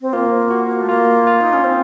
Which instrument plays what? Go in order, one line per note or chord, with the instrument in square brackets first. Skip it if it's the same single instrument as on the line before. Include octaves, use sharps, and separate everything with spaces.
[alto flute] C4
[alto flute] A#3 [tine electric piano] F4
[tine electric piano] F#4
[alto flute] A3
[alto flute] A#3 [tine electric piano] F4
[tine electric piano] F4
[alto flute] D#4
C#4
C4